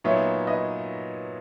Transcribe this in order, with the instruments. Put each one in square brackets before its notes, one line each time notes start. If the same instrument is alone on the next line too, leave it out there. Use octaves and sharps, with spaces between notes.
[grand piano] A#2 F#3 B3 D#4 [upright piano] C#5 E5
[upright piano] B4 D#5